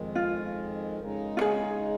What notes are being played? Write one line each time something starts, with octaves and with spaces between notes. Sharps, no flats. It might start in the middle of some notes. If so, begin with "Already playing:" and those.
Already playing: F2 D#3 G#3
F4
C#3 G#3 D#4
F4
G#4